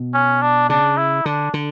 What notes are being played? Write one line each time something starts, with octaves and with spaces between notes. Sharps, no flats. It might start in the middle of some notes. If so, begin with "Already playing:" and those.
Already playing: B2
C#4
D4
C#3 D4
E4
D3 D4
D3